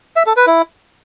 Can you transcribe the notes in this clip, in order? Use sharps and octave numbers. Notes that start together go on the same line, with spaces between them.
E5
A4
B4
E4